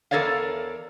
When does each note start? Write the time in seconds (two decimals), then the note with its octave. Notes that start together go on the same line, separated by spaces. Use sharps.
0.11 E2 A4 A#4 C#5 D5 F5